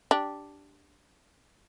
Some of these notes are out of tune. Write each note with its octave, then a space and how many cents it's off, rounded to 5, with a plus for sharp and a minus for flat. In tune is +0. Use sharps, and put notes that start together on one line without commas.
D4 +0 G4 +0